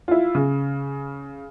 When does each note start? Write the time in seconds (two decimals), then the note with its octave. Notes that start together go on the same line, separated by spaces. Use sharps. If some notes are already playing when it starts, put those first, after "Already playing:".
0.08 E4 F4
0.35 C#3